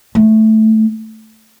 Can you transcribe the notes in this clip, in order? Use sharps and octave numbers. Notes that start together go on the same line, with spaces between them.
A3